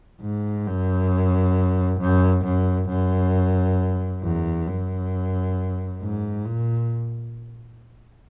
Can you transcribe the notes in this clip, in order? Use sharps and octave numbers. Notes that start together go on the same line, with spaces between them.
G#2
F#2
F#2
F#2
F#2
E2
F#2
G#2
A#2